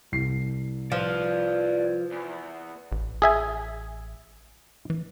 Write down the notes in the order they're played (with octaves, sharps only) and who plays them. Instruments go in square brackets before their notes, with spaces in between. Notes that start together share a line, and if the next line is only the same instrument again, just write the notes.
[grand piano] C2 C7
[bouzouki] F3 [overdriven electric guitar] B4 D5
[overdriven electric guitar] E2
[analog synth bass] A1
[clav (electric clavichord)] G#4 E5 G#5
[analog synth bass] E3